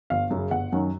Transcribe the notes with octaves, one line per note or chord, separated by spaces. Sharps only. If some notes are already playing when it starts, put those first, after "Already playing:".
G1 F5
F#2 C#3
G1 F#5
F#2 D#3 F#3